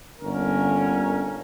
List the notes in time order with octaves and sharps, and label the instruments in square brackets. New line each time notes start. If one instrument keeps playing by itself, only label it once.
[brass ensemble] G1 D3 A#3 C#4 A#4